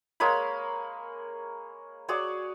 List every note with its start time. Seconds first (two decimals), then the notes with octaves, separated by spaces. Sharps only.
0.20 G#3 A#3 C#5 B5
2.08 F#4 G#4 C#5 D5